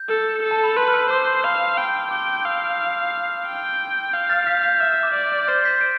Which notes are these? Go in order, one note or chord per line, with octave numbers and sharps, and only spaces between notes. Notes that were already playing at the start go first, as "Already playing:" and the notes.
Already playing: G6
A4
A4
A5
B5
B4 C6
F6
E6
C5 D6
C6
F5 B5
G5 B5
C6
G5 D6
D6
F5 E6
G6
F6
G5
F5 G6
F6 A6
G6 B6
G6 B6
E5 F6
D6
D5
G6
C5 F6 A6
G6 B6
B6 D7